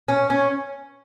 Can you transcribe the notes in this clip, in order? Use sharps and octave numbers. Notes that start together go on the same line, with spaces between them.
C#4
C#4